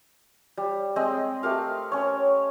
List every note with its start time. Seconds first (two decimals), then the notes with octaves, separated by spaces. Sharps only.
0.57 G3
0.96 G#3 C4 D#5 E6
1.43 A3 G4 A#4 F5
1.92 C#4 C#5